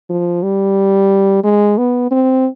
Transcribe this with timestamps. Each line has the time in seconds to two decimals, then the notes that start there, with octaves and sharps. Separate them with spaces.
0.10 F3
0.43 G3
1.44 G#3
1.78 B3
2.11 C4